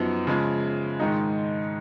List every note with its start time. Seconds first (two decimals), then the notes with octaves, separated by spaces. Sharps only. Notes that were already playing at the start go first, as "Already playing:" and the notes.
Already playing: F#2 F3 B3 D#4
0.27 C#3 F3 G#3
1.00 G#2 D#3 G#3 D#4